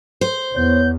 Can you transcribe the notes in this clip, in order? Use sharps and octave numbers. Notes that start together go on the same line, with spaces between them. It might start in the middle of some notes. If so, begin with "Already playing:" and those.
C5
E2 B3 C#5 G6